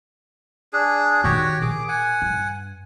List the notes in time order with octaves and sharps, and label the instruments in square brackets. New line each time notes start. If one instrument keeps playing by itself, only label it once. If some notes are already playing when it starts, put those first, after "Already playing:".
[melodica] D4 G#4
[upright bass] A#2 D#3 [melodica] F#4 G4 C#5
[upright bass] A#2 [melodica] G#4 D6
[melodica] F#5 G#5
[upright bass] G2